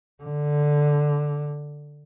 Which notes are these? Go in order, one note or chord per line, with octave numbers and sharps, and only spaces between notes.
D3